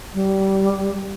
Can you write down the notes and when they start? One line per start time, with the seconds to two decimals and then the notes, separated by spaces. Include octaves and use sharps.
0.14 G3